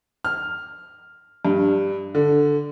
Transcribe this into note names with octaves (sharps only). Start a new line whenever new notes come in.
F6
G2
D3